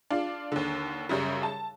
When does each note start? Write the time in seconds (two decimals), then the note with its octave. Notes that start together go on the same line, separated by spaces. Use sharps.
0.10 D4 F4
0.52 D#2 D3
1.09 F#2 C#3 G3
1.43 A5